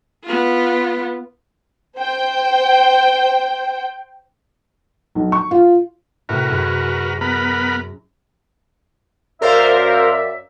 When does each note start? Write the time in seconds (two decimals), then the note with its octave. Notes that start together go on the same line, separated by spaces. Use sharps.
0.24 B3 F4
1.98 C5 G5
5.15 B1
5.32 C#6
5.51 F4
6.29 A2 C3 F#4 A#4 B4
6.49 F#2 G#4
7.21 B3 A#4 A#5 B5 F#6
9.42 F#2 A#4 C5 D5 E5 F5